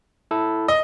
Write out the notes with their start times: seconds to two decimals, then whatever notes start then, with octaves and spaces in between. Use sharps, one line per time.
0.31 E4 A4
0.68 D#5